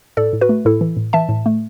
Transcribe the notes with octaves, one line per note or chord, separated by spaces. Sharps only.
A2 A4 D5
A2
F#4 B4
A3
A2 E4 A4
E3
A2
E3 E5 A5
A2
A3